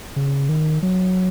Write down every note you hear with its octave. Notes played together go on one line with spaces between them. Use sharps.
C#3
D#3
F#3